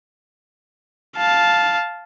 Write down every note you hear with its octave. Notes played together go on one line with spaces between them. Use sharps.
F5 A5